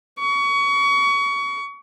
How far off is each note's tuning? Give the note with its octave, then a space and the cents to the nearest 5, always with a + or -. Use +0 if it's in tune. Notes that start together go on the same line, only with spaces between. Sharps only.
C#6 +25